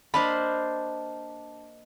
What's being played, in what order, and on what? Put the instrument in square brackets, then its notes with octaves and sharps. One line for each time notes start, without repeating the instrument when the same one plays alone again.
[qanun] A#3 D4 C5 [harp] D#5 A5 F6 [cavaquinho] B5